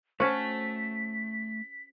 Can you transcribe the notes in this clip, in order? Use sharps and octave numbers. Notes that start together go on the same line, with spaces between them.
A3 C#4 F#4 C5 A5 B6